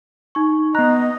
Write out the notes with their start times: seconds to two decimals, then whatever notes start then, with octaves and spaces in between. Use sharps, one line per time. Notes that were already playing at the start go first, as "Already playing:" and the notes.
0.35 D#4 C#6
0.75 B3 D#5 A#5 F#6